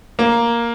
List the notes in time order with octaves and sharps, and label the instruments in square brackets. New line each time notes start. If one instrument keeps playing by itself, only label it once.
[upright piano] A#3